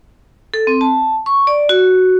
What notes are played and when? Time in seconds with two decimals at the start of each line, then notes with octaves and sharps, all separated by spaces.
0.54 A4
0.67 C4
0.81 A5
1.26 C#6
1.47 D5
1.69 F#4